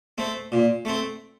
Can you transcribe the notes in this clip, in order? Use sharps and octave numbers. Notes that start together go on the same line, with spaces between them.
A3 C4
A#2
A3 C4